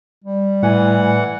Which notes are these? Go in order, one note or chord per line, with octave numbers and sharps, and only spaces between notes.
G3
A2 E3 F#5 G#5